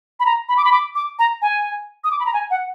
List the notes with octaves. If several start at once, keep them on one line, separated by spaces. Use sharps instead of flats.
B5
A#5
B5
D6
B5
D6
D6
A#5
G#5
D#6
D6
B5
A#5
G#5
F#5